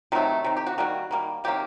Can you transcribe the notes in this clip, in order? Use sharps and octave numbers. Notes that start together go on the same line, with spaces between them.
C3 D#3 F#3 A3
C3 D#3
G4
F#4
D#3 G3 A#3 F#4
D#3 G3 A#3
C3 D#3 F#3 A#3 G4